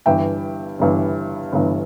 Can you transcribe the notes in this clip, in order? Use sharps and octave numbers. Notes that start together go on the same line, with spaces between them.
G1 G2 E3 E5 G5
G1 G2 E3
G1 G2 E3